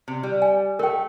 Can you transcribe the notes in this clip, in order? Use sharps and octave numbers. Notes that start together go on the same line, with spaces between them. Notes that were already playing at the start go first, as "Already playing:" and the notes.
C3
G3
G#5
A3 A#4 G5